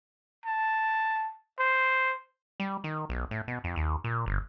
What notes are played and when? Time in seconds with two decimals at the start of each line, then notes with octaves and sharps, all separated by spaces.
0.46 A5
1.59 C5
2.60 G3
2.84 D#3
3.09 B1
3.31 A2
3.48 B2
3.64 F2
3.76 D#2
4.04 A#2
4.26 G1